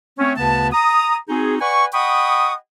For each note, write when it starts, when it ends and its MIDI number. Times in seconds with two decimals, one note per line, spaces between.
0.18 0.34 57
0.18 0.34 60
0.18 0.34 61
0.37 0.72 38
0.37 0.72 49
0.37 0.72 59
0.37 0.72 71
0.37 0.72 81
0.73 1.17 82
0.73 1.17 87
1.29 1.56 60
1.29 1.56 63
1.29 1.56 66
1.29 1.56 68
1.60 1.86 71
1.60 1.86 74
1.60 1.86 78
1.60 1.86 80
1.60 1.86 85
1.94 2.54 75
1.94 2.54 78
1.94 2.54 79
1.94 2.54 83
1.94 2.54 85
1.94 2.54 87